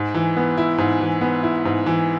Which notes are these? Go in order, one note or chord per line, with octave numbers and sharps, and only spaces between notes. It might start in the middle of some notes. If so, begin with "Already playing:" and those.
Already playing: G#2
E3
B3
E4
G#2
E3
B3
E4
G#2
E3